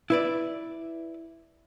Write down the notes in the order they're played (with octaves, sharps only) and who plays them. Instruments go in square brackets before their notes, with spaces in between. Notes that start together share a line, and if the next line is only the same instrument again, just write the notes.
[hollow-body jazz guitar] E4 B4 D5